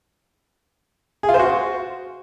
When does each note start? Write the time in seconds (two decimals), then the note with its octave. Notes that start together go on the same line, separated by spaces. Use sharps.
1.23 G#4
1.29 F4
1.34 C5
1.39 F#4